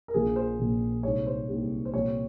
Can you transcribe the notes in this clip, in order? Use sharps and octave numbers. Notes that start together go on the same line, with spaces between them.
A#4
A#1 A#2 F3 G#4
C5
A#1 A#2 F3
C2 A#2 G#3 D#4 C#5
C5
C2 A#2 G#3 D#4
C5
C2 A#2 F3 C4 C#5